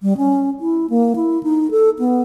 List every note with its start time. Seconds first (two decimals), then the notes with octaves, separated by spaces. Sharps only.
0.02 G3
0.17 C#4
0.60 E4
0.90 A#3
1.16 E4
1.43 D#4
1.71 A4
1.99 B3